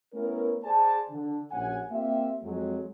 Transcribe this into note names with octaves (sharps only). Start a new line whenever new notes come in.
A3 B3 C#4 E4 A#4
G#4 C5 D5 G#5 A5
D3
A#1 C#4 F#4 F#5 G#5
A#3 C4 F4 G4 E5
F2 F#3 G#3